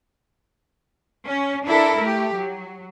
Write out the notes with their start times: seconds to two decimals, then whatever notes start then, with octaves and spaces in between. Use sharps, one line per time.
1.28 C#4
1.67 D4 E4 A4 A#4
2.00 A3 G4
2.35 F#3